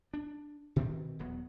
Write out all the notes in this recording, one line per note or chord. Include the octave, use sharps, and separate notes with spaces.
D4
B2 D#3 E3 C4
D#1 E2 F#3 B3